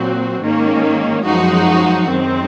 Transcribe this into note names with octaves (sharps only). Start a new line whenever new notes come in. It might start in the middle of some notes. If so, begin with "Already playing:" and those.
Already playing: A#2 F#3 C4 F#4
G#2 D#3 A#3 C#4
F#2 F3 G#3 D#4 F#4
F#2 D#3 G#3 C4